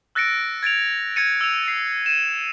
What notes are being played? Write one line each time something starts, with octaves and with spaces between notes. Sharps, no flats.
E6 F#6 A6 A#6 C#7 D7
G#6 A6 D7 F7
G#6 A6 C#7 D#7
E6 F7
C7
D#7 E7